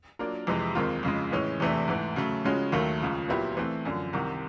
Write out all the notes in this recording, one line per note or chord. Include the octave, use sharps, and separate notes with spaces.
F#3 A#3 D4 F4 A#4
F2 C3 E3 G#3
D#2 D#3 G#3 C4 F4
F2 C#3 F3 G#3
A2 E3 G#3 C#4
E2 C3 E3 A3 D4
G#2 E3 A3
C#3 F#3 A3
C#3 F3 G#3 C#4 F#4
D#2 D#3 F#3 A3
C#2 C#3 F3
A#2 F#3 B3 E4 G4
E3 A3 C4
F#2 D3 F3
C2 C3 D#3